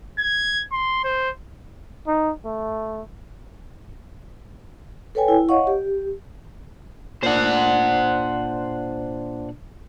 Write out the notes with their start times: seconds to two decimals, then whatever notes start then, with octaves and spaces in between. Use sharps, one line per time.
0.19 G#6
0.72 C6
1.04 C5
2.07 D#4
2.45 A3
5.15 A4 B4 C#5 G5 G#5
5.28 E4
5.49 C#5 D#5 F5 F#5 C#6
5.67 G4
7.23 A#2 D4 C5 F#5